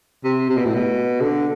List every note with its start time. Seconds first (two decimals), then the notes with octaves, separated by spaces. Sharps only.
0.24 C3
0.49 C3
0.57 B2
0.65 A2
0.74 B2
1.21 D3